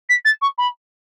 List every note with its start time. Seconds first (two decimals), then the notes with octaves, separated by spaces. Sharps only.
0.09 B6
0.25 A6
0.41 C#6
0.58 B5